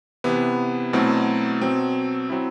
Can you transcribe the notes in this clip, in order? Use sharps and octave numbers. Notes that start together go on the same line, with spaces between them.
C3 E3 B3
B2 F#3 A3 C4 E4
B2 F#3 C4
F#3 C4 E4